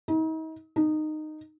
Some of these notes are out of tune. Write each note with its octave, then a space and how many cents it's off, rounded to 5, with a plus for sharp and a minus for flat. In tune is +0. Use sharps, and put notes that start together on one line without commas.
D#4 +40
D#4 -15